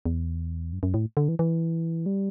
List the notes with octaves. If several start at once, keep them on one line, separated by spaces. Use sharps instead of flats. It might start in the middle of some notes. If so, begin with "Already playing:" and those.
E2
F#2
F#2
A2
D3
E3
E3
G3